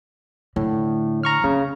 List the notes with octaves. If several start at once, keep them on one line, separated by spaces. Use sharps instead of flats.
A2 D3
A#5 C#6 F6
C#3 C4